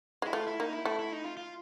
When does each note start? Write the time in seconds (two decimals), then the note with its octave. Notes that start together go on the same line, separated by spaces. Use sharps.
0.22 G#3 E4
0.33 A3 F4
0.47 E4
0.60 A#3 D#4
0.72 E4
0.85 A3 E4
0.99 E4
1.12 D#4
1.24 F4
1.37 F4